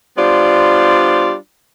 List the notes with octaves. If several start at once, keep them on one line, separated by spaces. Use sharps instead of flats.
G3 B3 D4 F4 C5 D5